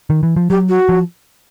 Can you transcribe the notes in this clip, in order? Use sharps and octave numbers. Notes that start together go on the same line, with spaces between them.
D#3
E3
F3
F#3 G4
F#4
F3